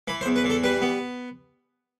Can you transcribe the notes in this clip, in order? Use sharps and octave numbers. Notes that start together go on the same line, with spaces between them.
E3 B5
C5
E2
B4
E3
A4
G3 B4
B3